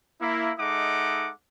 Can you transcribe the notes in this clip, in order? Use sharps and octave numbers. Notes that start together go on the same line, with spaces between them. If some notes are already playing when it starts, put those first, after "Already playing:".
A#3 E4
G#3 D#4 A4 E5 F#5 D6